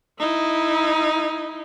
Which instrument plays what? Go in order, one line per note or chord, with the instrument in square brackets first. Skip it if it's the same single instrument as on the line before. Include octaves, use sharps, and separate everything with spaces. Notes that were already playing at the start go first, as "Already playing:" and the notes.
[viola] D#4 E4